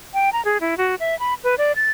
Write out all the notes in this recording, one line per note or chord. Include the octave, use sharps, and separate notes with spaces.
G5
A#5
G#4
E4
F#4
E5
B5
B4
D5
A6